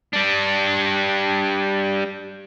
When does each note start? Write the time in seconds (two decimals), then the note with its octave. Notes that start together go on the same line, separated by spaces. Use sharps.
0.13 G3 D4